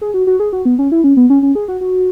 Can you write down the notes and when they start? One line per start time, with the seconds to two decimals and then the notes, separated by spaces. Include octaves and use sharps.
0.01 G#4
0.14 F#4
0.27 F#4
0.40 G#4
0.53 F#4
0.65 B3
0.79 C#4
0.92 E4
1.04 C#4
1.17 B3
1.30 C#4
1.42 C#4
1.55 G#4
1.68 F#4
1.81 F#4